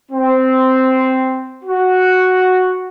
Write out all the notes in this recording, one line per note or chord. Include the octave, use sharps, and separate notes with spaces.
C4
F#4